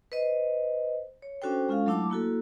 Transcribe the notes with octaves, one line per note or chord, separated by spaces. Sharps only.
B4 C5 D#5
C#5
C#4 D4 F#4 A4 C5 G5
G#3 C#4 F4 A4 F5
F#3 A3 D4 E4 A5 D6
A#3 E4 F#4 A4